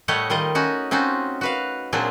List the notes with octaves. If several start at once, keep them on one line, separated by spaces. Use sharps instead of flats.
A2 G3 A3 C#5 D#5 F#5
D#3 G3 F4 D#5
C#4 D#4 F#4
C4 C#4 D#4 F4 F#4
F#4 B4 F5
A#2 F#3 C4 D4 F4 G#4